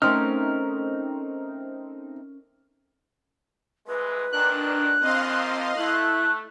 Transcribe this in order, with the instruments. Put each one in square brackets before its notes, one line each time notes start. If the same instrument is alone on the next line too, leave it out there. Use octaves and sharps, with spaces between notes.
[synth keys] A3 C4 D#4 [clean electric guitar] C#4 A#4 [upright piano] F6
[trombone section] C2 E3 G#3 [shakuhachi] B4
[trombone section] A#2 D#3 [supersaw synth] D4 [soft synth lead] F#6
[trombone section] D#2 F3 [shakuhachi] C4 [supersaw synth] D#5 F5 C6
[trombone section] A3 [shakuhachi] E4 [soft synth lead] F#6